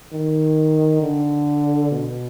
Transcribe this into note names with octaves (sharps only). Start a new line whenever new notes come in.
D#3
D3
B2